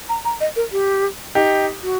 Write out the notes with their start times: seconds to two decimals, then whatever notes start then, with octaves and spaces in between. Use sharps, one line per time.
0.09 A#5
0.25 A#5
0.40 D#5
0.56 A#4
0.72 G4
1.35 D#4 G4
1.82 F#4